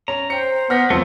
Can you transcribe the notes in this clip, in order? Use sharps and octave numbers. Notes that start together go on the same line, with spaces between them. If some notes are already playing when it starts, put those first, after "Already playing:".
C#4 A#5
C5 G5 C#7
B3 F6 A#6 B6
B1 F2 F3 A3 C4 A#4